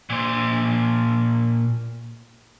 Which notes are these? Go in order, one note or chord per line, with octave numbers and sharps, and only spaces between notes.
A#2 C5